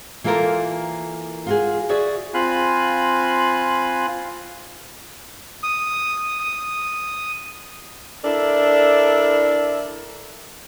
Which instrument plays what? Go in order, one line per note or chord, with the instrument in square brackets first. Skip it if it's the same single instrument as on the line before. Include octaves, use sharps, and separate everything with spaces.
[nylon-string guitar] E3 A#3 F4 A4 A#4
F4 F#4 G#4
F#4 G#4 D5 E5
[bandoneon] C4 F4 F5 G#5 B5 F#6
[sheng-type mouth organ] D#6
D#6
[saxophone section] D4 E4 A4 A#4 D5